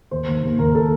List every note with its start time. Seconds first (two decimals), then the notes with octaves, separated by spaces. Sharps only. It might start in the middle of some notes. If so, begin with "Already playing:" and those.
0.11 D#2 C5
0.28 D#2
0.43 D#2
0.59 D#2 A#4
0.75 A4